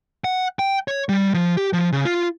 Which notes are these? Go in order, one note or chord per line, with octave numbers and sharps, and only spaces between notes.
F#5
G5
C#5
G3
F3
G4
F3
C#3
F4